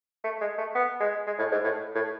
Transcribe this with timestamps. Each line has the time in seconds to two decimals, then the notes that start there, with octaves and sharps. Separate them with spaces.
0.24 A3
0.41 G#3
0.58 A3
0.75 B3
1.00 G#3
1.27 G#3
1.38 A2
1.52 G#2
1.64 A2
1.95 A2